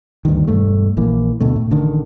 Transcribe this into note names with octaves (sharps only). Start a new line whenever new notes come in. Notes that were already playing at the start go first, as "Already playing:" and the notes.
D2 G2 D#3
E1 G2 A3
A#1 E3 A#3
D2 B2 A3
A2
A1 D3 D#3